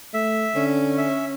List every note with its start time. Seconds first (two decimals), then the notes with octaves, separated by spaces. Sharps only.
0.14 A3 E5
0.55 D3 C#4
0.98 E5